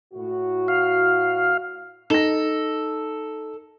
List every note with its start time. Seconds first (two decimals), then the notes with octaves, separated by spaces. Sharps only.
0.14 A2 F#4
0.68 F5
2.10 D#4 A4 A#6